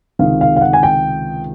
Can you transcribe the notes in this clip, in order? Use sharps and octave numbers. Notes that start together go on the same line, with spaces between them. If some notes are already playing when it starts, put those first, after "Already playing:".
C#2 C3 D#3 G#3 F5
F5
F5
F#5
G#5
G5